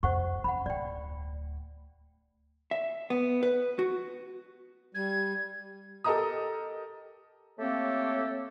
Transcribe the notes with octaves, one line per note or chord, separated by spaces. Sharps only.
F2 C5 F#5 C#6
F#2 F#5 B5
D1 A3 D5 G5
E5
B3
B4
F#4
G3 G#6
G4 A4 A#4 D#5 A#5 D#6
A3 A#3 C4 G4 A4 C#5